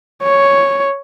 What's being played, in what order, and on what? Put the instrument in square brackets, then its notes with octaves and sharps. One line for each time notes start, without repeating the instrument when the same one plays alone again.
[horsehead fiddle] C#5